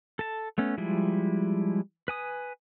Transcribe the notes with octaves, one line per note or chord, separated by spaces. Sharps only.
A4 A5
A3 B3 C#4
F3 G3 G#3 E4
B4 G#5 D#6